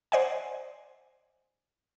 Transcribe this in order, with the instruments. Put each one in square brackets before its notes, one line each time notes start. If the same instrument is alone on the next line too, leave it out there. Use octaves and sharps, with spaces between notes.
[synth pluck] C5 D5 D#5 F#5 G#5